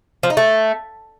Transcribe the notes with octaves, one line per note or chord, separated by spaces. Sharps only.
F3
D#4
A3